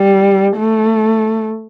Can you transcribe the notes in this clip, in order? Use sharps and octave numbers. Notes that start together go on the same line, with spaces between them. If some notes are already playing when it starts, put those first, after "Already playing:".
Already playing: G3
A3